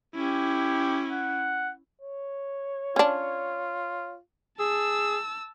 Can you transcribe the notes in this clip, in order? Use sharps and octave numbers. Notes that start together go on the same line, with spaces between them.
C#4 E4 G4
F#5
C#5
C#4 D4 F4
G#4 A5 E6